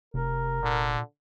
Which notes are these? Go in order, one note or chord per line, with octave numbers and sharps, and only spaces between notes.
F1 C3 A#4
A#2 D3